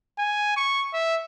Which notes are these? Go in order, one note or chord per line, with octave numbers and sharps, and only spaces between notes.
G#5
C#6
E5